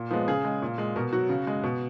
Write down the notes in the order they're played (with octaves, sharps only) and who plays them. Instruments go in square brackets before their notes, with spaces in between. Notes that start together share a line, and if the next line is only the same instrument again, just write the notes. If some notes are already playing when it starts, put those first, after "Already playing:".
Already playing: [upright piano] A#2
F3 B3
G#3
C#3 G#4
G#3
A#2
G#3
B2 A#4
F#3 F#4
C#3
G#3
B2